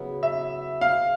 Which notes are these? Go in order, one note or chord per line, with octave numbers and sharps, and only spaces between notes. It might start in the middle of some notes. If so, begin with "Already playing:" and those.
Already playing: C#3 F#3 B3 E4
E5
F5